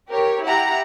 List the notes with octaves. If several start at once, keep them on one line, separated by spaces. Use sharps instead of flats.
G4 A#4 C#5
E4 G4 F#5 A#5